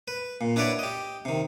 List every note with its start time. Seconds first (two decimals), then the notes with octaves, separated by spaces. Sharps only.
0.08 B4
0.41 A#2
0.56 D4 E4 F#4 B4 C#5 D5
0.79 G4 D#5
1.25 C3 D#3